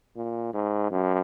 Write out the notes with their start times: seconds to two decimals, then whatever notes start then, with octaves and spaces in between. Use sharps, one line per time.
0.16 A#2
0.54 G#2
0.91 F#2